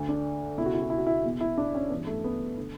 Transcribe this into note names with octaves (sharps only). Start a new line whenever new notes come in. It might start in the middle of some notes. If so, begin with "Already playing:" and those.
Already playing: D2 D3
D4
C#2 B2 E4
F#4
E4
F#4
E4
F#4
E4
E2 B2
E4
D4
C#4
G2 E3 B3
A3
B3
D3